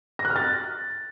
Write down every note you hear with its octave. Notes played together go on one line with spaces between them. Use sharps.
A#6
F#6
F6
A6